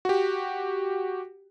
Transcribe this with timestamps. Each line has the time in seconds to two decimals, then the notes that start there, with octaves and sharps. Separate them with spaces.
0.05 F#4 G4